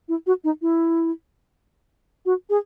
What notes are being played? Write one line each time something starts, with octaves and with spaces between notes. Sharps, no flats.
E4
F#4
D#4
E4
F#4
G#4